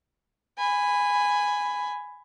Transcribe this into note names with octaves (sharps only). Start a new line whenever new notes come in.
G#5 B5